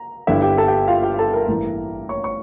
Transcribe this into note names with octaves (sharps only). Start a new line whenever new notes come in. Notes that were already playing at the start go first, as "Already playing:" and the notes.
Already playing: A#5
G1 G2 D3 G3 E4 E5
G4 G5
A4 A5
G4 G5
F4 F5
G4 G5
A4 A5
A#4 A#5
A1 G2 E3 A#3 E4
C#5 C#6
C#5 C#6